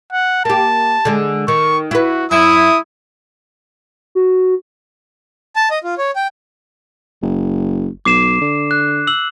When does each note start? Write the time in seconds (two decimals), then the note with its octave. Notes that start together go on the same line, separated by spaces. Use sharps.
0.13 F#5
0.45 A#3 G4 A5
1.05 D3 G#3
1.48 D#3 C#6
1.91 E4 F#4 B4
2.31 F#2 E4 D#6
4.15 F#4
5.56 A5
5.71 D#5
5.84 F4
5.98 C#5
6.16 G5
7.22 F#1
8.05 B1 D6 C7 E7
8.41 D3
8.71 F#6
9.07 E6 F#7